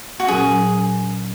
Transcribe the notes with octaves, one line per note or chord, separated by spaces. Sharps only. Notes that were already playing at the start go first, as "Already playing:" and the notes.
F#4
A#2 F#3 C#4 G#4